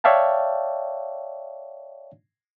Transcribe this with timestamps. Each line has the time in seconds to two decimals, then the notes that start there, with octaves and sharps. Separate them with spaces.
0.04 C#5 D5 E5 F5 G5 A5